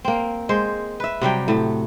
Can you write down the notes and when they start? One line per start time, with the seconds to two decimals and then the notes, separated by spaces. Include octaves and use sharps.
0.05 A#3 C4
0.49 G#3 C5
1.00 B4 E5
1.21 C3 F#3 G3 G5
1.48 A2 A3